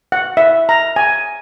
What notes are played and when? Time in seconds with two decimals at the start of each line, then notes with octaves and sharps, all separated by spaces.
0.12 F#5
0.37 E5
0.69 A#5
0.96 G#5